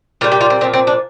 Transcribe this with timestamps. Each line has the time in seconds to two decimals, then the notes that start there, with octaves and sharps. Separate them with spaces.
0.21 A#2 G3 F4
0.32 G4
0.41 F4
0.50 C4
0.61 A#2 F3 C4
0.73 C4
0.87 D4